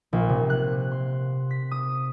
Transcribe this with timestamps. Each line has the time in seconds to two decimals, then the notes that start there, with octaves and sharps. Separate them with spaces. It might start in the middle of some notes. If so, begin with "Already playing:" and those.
0.13 A#1
0.29 C3
0.50 F#6
0.92 C6
1.51 B6
1.71 D#6